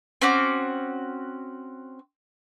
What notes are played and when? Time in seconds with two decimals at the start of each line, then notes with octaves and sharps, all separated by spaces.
0.22 C4 C#4 F#4 D6